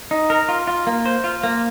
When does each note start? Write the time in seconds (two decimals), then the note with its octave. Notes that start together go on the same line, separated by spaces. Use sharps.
0.11 D#4
0.30 A#4
0.49 F4
0.67 F4
0.87 A#3
1.06 C5
1.24 F4
1.43 A#3